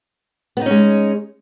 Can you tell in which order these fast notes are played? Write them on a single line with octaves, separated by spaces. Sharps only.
B3 D#4 C#4 G#3